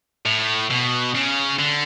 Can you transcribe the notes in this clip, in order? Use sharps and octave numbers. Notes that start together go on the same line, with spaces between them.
A2
B2
C#3
D3